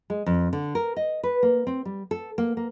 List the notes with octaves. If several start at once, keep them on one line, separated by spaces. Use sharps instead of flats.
G#3
F2
D3
A#4
D#5
B4
A#3
C4
G3
A4
A#3
A#3